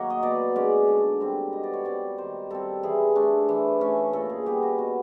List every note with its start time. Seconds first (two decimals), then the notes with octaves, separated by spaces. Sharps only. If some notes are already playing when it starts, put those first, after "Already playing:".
Already playing: D#3 F#3 A#3 C#5
0.10 D#5
0.22 B2 D5
0.56 G#3 C#4 D5
0.88 D3
1.20 G3 C4
1.53 B2 D#5
1.63 D5
1.73 C#5
1.85 G3 C4 D5
2.18 D#3 C5
2.50 G3 C4 A4
2.83 E3 G#4
3.15 A3 D4
3.49 E3
3.81 A3 C#4
4.13 A#2 A4
4.30 G#4
4.46 G3 B3 G4
4.62 F#4
4.78 B2 F#4